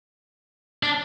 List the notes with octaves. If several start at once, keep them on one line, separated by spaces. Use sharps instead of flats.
D4